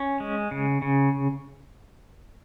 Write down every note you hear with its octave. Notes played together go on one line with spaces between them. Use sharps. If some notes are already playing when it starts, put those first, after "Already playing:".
Already playing: C#4
G#3
C#3
C#3